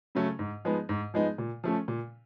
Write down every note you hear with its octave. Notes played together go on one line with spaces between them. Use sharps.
C#3 F#3 A3 C#4
G#2
F3 G#3 B3 D#4
G#2
F3 G#3 B3 D#4
A#2
F3 A3 C#4
A#2